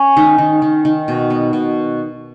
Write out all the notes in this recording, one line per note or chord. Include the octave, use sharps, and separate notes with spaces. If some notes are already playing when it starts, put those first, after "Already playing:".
Already playing: C#4
D#3 D#4
D#3
D#3
D#3
B2
B3
B2